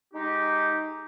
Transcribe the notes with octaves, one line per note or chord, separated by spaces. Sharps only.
G#3 D#4 G4